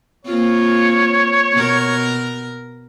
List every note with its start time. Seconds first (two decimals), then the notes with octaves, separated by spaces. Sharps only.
0.25 A#3 C4 F4 C#5
1.53 B2 A#4